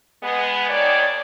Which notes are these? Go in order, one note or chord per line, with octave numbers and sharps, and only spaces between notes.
G#3 B3
D#2 D#3 C#5 D5